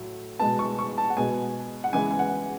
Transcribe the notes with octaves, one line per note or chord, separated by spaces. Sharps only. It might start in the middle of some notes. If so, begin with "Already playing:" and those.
Already playing: A2 F#3 A3
B2 G#3 B3 A5
C#6
C#6
A5
F#5
B2 G#3 B3 G#5
F#5
C#3 E3 G#3 B3 G#5
G#5
F#5